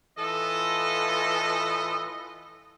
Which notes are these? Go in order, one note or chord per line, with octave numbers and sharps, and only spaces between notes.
A2 E3 F4 A4 B4 D#5